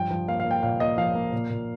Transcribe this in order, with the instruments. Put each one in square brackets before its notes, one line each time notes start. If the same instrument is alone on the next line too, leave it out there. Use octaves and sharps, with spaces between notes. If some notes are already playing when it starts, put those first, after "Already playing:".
Already playing: [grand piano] G2 F3 G5
F3
A#3 F5
F5
A#3
G5
A#2 F5
A#3 D#5
F3 F5
A#3
A#2
A#2